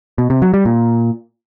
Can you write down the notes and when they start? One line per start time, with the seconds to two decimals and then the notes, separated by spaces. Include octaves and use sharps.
0.18 B2
0.30 C3
0.42 F#3
0.54 G3
0.65 A#2